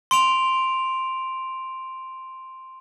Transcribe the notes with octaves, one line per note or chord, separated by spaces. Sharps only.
C6 D7 F7